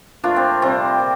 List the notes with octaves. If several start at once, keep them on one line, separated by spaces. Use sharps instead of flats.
A#2 F3 A3 D4 F4
C4
C3 G3 C4
A#2